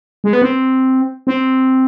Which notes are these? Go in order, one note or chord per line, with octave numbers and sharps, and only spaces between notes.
G#3
B3
C4
C4